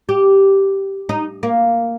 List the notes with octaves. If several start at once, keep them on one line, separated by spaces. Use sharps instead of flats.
G4
D#4
A#3